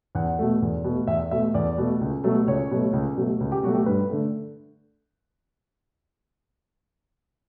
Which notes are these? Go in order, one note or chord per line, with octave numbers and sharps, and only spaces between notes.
E2 F#5
B2 A3
E2
B2 A3
E2 E5
B2 A3 E5
E2 D5
B2 A3
C#2
B2 F#3 A3
C#2 C#5
B2 F#3 A3
C#2
B2 F#3 A3
C#2
G4
B2 F#3 A3 F#4
G4
G2 B4
D3 A3